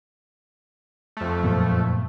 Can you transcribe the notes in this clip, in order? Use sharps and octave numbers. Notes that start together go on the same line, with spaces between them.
F2 A3
F#2 A#2 B3